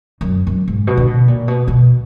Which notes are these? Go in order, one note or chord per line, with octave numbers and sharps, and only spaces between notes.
F#2
F#2
G#2
B2
D3
B2
A#2
B2
B2